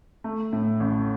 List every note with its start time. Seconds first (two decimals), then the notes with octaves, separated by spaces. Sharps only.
0.24 A3
0.52 A2
0.80 A1